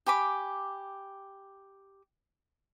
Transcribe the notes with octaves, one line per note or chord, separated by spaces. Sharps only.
G4 G#5 B5 D6